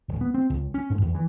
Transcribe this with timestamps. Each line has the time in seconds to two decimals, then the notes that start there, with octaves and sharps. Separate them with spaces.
0.08 D1
0.21 B3
0.34 C4
0.50 C#2
0.74 C#4
0.90 G#2
1.02 E2
1.15 E3